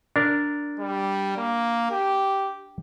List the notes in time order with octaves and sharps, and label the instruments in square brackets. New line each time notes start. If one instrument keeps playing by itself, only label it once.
[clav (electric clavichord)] D4 A#4
[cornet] G3
A#3
G4